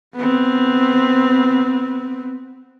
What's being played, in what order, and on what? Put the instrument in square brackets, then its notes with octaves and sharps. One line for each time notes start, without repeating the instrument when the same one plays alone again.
[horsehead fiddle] B3 C4